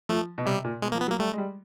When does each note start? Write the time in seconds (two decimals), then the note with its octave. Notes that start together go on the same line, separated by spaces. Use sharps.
0.09 F3 A3
0.38 B2
0.45 C3 G3
0.64 A#2
0.82 B2 G#3
0.92 F3 A#3
1.01 B3
1.08 F#3 A#3
1.19 G3 A3
1.33 G#3
1.38 G3